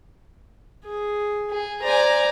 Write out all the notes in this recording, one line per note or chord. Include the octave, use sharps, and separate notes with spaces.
G#4
G#4
C5 D5 G#5 A#5